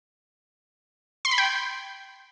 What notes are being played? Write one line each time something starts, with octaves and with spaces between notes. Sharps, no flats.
C6
B5
G5